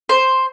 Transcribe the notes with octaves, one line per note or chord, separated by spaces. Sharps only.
C5